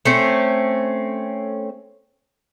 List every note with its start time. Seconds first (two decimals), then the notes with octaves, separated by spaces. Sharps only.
0.05 A3 C4 C#4